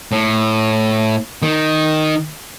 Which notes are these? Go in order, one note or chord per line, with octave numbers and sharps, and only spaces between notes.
A2
D#3